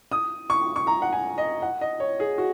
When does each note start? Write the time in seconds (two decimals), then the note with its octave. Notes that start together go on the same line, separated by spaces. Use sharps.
0.12 D#6
0.50 C#6
0.76 C#6
0.87 A#5
1.02 F#5
1.13 G#5
1.38 D#5
1.62 F#5
1.81 D#5
2.00 C#5
2.20 G#4
2.38 F#4